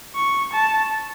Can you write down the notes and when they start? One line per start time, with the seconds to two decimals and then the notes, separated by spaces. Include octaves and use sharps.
0.16 C#6
0.54 A5